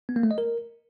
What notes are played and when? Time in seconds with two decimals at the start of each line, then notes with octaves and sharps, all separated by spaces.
0.09 B3
0.16 A#3
0.23 A3
0.31 D#5
0.38 A#4